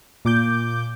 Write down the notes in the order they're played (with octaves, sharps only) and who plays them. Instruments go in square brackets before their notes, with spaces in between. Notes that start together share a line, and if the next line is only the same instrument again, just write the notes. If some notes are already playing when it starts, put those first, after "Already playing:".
[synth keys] A#2 D6 G6